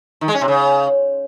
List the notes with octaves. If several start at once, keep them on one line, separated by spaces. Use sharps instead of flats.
D#3
G#3
C#4
C3
C#3